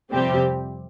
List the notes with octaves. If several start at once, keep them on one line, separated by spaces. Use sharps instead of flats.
F2 C3 G3 C4 G4